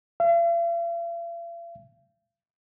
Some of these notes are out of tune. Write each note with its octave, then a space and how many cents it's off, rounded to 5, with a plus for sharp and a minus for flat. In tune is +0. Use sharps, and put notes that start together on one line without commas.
F5 -45